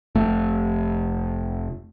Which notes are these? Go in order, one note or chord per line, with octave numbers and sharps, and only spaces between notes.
F1 A3